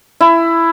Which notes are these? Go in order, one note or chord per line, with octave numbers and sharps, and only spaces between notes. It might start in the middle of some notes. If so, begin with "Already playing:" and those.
E4